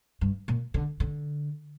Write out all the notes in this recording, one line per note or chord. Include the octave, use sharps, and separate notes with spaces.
G2
A#2
D3
D3